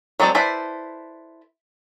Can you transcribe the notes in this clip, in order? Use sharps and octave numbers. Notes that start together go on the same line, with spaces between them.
F#3 G#3 C4 A4 D5
E4 A4 B4 C5 D5